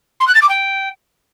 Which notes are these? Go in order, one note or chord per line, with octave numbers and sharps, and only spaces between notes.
C6
F#6
A6
D6
G5